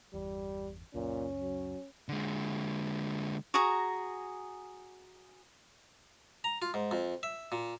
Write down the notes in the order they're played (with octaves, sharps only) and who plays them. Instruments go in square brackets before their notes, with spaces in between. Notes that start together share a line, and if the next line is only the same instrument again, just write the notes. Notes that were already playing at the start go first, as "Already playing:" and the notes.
[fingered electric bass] G1 E2 [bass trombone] G3
[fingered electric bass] C#2 F#2 [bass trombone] A#2 [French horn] C#4
[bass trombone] F#3
[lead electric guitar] D3 G#3
[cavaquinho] F#4 G#4 A#5
[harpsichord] A#5
F4
G#2
F2
E5
A#2